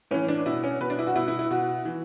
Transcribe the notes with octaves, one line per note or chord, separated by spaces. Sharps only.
A2 E3 C#4
D4
B2 E4
C#4
B2 B4
D4
E4
F#4
B2 E4
E4
E4
B2 F#4
E3